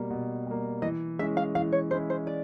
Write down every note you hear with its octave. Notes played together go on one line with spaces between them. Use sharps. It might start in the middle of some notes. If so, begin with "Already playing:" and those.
Already playing: B2 G3 A#3
B2
G3 A#3
E3 D#5
G#3 C#4 E4 E5
F5
E3 F5
C#5
G#3 C#4 E4 C5
C5
D5